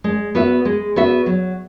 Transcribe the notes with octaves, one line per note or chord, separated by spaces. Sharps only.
G#3
B3 F#4 B4 E5
G#3
B3 F#4 B4 E5
F#3